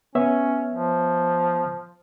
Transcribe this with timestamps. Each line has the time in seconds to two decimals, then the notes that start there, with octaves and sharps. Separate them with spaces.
0.15 B3 C#4 C#5 E5
0.72 F3